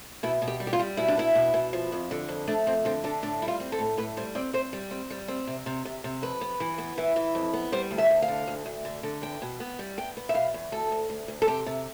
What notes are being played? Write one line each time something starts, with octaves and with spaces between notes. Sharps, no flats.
B2 E4
B2
G4
G3
G4
F4
G3
B2 E4
D4
B3 E4
B2
B2
F3
F2
D3
F2
A3 D4
F2 C4
D3 C4
D3 D4
A2 D4
G3 E4
F4
C4
A4
A2
A2 B4
G3 C5
C4 D5
C4 C5
G3
C4
G3
C4
C3
C3
C3
C3
F2 B4
B3
E3
B3
E3
E3
F2
B3
G3 C5
D2
E5
D2
F5
D3
D2
D2
D3
D3
E2 G5
B2
B3
G3
B3 G5
B3
E5
B2 F5
E2
D2 A4
D2
D2
D2
A4
C3 G4
C3